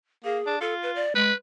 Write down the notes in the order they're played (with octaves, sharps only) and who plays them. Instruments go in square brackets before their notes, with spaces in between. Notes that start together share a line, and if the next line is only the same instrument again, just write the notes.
[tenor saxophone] A#3 [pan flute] G#4
[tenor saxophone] D4
[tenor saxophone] F4 [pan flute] A4
[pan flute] B4
D5
[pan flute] G#3 [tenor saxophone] B4